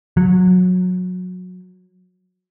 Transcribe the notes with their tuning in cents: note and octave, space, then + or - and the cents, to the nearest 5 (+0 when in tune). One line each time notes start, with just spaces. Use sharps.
F#3 -20